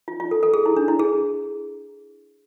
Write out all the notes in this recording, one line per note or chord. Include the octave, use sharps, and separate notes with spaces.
F4
F4
A4
A4
G#4
E4
D4
E4
G#4